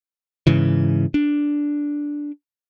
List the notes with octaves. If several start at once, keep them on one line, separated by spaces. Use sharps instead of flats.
G#2 C#3 E3
D4